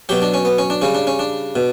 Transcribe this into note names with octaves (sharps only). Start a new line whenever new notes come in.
B2 F#3 G4
D4
C#4
B3
C#4
D4
C#3 G3 C#4
D4
C#4
D4
B2